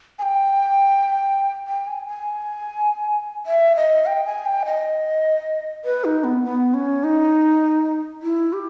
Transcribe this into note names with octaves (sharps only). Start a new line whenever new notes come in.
G#5
G5
G5
G#5
G#5
E5
D#5
G5
G#5
G5
D#5
B4
D#4
B3
B3
C#4
D#4
E4
G4